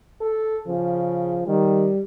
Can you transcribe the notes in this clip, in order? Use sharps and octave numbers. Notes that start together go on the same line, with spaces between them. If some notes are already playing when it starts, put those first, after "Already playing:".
A4
C#3 F3
D#3 G3